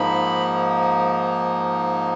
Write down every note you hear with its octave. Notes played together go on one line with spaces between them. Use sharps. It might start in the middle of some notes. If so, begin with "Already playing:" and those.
Already playing: G#2 F3 A#3 D#4 B5